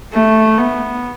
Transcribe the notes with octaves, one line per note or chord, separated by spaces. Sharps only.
A3
B3